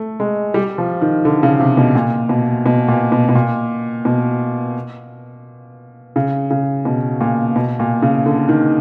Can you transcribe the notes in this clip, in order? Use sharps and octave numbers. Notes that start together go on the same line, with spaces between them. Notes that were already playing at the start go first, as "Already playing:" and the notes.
Already playing: A3
G#3
G3
F3
D#3
D3
C#3
C3
B2
A#2
B2
B2
A#2
B2
B2
A#2
B2
C#3
C#3
B2
A#2
B2
A#2
C#3
D3
D#3